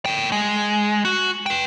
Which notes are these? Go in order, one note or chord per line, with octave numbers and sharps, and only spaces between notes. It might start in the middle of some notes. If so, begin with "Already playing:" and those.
A2 G5
G#3
F#4
B4 G5